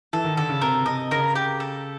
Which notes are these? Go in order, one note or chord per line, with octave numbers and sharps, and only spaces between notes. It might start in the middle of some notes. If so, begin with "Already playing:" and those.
E3 A4
D#3
D3 A4
C#3
C3 A#4
C3 D#5
C#3 A#4
G4
A4